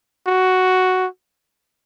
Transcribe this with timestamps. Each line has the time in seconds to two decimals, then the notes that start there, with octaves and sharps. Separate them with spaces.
0.27 F#4